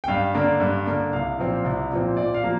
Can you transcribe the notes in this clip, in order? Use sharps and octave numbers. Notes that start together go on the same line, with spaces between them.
G5
G2 F5
D3 A#3 D4
G2
D3 A#3 D4
C2 F5
A#2 F3 C4
C2
A#2 F3 C4
A#2 D5
F5
F3 A#3